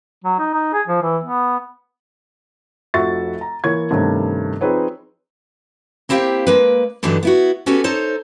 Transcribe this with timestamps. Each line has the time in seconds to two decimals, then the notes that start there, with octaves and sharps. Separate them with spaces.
0.24 F#3
0.39 D#4
0.54 D#4
0.73 G#4
0.87 F3
1.02 E3
1.23 B3
2.94 F1 F3 F#4 E5 C#6 A6
3.41 A#5
3.64 E3 A#3 C#5 C#6 G#6
3.91 G2 C3 D#3 A3 C#4
4.61 F3 C4 D#4 G#4 B4 C#5
6.09 A#3 C4 E4 G4 F5 G5
6.47 G#3 A#3 B4
7.03 G2 D3 E3 F#3 D4 D#4
7.23 B3 E4 F#4
7.66 B3 C#4 F#4 G4 A4 G#5
7.84 D#4 A4 C5 C#5